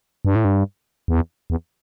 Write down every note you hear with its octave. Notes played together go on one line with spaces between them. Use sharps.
G2
A2
G2
E2
E2